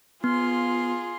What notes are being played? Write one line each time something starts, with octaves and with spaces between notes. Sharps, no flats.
B3 F4 G#4 C6